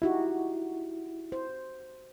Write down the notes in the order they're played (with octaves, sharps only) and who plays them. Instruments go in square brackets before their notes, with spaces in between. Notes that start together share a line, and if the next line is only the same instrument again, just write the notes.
[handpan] D#4 F#4 G4 [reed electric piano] E4
[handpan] C5